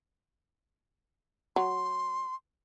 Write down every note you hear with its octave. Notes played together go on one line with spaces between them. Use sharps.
F#3 C6